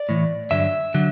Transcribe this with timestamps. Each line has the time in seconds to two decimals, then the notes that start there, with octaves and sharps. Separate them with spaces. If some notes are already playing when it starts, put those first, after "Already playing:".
Already playing: D5
0.09 A2 E3
0.51 G2 D3 F#3 E5
0.94 D3 F#3